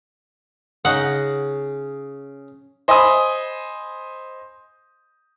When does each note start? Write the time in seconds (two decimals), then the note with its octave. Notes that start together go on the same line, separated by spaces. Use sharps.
0.85 C#3 D#4 F#5
2.88 C5 D#5 G#5 B5 C6 D#6